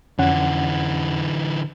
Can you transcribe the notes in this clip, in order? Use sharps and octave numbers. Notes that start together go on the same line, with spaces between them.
F2 D3 E3 C#4 F#5